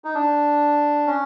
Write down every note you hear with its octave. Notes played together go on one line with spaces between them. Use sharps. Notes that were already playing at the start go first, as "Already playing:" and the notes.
D#4
D4
C#4